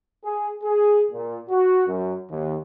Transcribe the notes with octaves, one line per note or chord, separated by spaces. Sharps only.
G#4
G#4
A#2
F#4
F#2
D#2